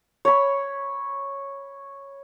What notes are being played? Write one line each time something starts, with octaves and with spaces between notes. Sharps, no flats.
C#5 B5